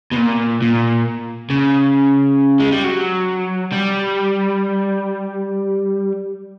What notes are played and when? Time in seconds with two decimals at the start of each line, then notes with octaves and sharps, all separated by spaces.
0.13 B2
0.17 A#2
0.62 A#2
1.50 C#3
2.60 G#3
2.72 G3
2.84 F#3
3.72 G3